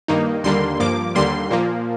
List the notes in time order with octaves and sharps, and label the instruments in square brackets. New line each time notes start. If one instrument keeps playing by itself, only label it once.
[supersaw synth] G2 D#3 A#3 D#4
D#2 D3 G3 A#3 C6
G2 F3 A#3 D6
D#2 D3 G3 A#3 C6
A#2 F3 A#3